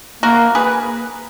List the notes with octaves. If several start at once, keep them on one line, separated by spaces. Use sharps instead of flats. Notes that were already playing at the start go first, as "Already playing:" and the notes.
A#3 F#4 A#4
G#4 B4